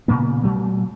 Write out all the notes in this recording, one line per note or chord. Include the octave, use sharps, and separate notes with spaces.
A#2 C#3 A#3 B3
A#2 F#3 A3